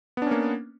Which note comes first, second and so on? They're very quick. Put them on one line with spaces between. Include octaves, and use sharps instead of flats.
B3 D4 C#4 A#3